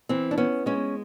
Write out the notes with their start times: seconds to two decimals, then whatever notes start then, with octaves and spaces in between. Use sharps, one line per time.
0.09 E3 C4
0.31 D4
0.38 B3 C#4
0.66 G#3 C#4